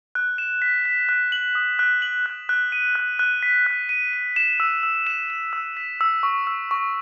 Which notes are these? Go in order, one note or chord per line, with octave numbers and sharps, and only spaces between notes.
F#6
E7
B6
B6
F#6
F#7
D#6
F#6
F#7
F#6
F#6
D#7
F#6
F#6
B6
F#6
D#7
D#7
E7
E6
E6
E7
E7
E6
B6
E6
C#6
E6
C#6